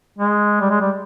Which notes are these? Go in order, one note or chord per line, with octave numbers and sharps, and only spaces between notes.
G#3
G3
G#3
G3